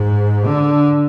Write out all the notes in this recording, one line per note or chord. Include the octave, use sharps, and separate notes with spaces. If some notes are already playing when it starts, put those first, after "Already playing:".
Already playing: G#2
D3